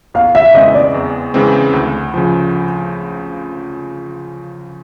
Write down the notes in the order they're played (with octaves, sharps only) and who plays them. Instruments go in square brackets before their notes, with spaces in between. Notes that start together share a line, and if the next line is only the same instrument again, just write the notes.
[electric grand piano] E2 [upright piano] F5
[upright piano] E5
[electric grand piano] C#3 E3 G#3 C4 [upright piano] D#5
[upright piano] D5
[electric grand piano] E2
C#3 E3 G#3 C4
D2
C#3 F3